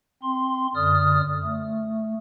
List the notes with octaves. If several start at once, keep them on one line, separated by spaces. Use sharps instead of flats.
C4 C6
F#2 D3 D5 D#6 F6
A3